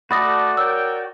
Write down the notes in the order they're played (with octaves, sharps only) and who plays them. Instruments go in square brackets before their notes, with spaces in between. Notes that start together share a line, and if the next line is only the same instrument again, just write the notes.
[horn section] A3 [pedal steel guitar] F#4 D5 [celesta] B5 D#6 A#6
[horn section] A#4 C#5 G5 [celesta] E6